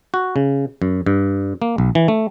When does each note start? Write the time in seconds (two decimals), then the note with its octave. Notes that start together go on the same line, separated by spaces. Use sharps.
0.14 F#4
0.36 C#3
0.82 F#2
1.06 G2
1.62 A#3
1.78 B1
1.95 E3
2.08 A3